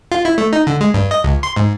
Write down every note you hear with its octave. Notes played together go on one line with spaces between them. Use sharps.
F4
E4
A3
D#4
D3
G#3
G2
D#5
C#2
C6
G#2